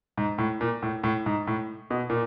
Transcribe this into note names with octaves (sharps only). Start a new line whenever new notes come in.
G#2
A2
A#2
A2
A2
G#2
A2
B2
A#2